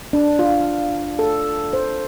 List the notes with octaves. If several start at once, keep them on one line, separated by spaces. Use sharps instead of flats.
D4
F4
A4
C5